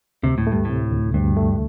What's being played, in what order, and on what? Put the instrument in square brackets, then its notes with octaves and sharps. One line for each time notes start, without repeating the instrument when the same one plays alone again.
[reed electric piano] D2 [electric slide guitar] C3
[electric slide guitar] A2
[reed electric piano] A3
[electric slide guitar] G2
[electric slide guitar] A2 [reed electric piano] C3
[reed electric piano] D2
[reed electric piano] D2 [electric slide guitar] G2
[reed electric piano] A3